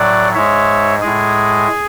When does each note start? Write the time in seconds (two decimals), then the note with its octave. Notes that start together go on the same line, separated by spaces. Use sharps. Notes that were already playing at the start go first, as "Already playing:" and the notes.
Already playing: A2 F#3 D5 F#5
0.35 G#2 G#3 C#5 E5
1.01 A2 G#3 G#4